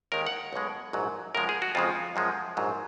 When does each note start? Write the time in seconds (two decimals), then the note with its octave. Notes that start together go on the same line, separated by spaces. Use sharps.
0.12 D#2 D#3 G#3 A#4
0.27 F#5
0.53 B1 B2 G#3
0.93 A#1 G#2 F#3
1.35 F#2 C#3 F3 G#3 A#4
1.49 G#4
1.62 F#4
1.75 F2 C#3 F3 G#3 F4
2.16 F#2 F3 G#3
2.57 A#1 G#2 F#3